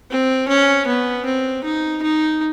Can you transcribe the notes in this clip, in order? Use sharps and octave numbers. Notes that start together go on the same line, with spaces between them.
C4
C#4
B3
C4
D#4
D#4